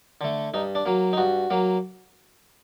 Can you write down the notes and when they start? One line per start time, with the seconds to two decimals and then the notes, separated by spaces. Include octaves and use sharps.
0.21 D3 A3
0.54 G2 D#4
0.75 D4
0.85 F#3 A#3
1.13 D#4
1.17 G2 F#4
1.50 F#3 A#3